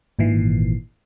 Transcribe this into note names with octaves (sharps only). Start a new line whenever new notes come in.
G#1 A#2 D#3 E3 C7